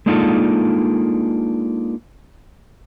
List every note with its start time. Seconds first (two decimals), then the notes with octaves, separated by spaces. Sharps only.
0.06 G#3 A#3 D4 D#4 F4 A4